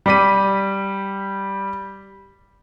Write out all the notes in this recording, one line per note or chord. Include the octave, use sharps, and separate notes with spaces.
G3 G4 D6 B6 D#7